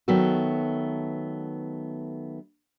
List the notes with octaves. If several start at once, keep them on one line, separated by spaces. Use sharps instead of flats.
D#3 F#3 A3 B3 A4